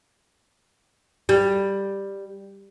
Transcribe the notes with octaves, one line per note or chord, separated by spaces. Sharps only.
G3